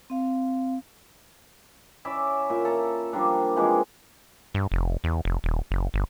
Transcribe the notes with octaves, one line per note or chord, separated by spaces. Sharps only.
C4 F5
C#4 E4 D5 E5
A#2 E5
A4 A#5
F3 G3 A#3 D4
C3 E3 F3 G#3
G2
F1
E2
F1
D#1
F#1
G1